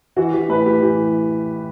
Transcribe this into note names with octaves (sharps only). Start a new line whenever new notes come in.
E3 F#4
E3 G4
A2 B4
A2 G4
E3 G4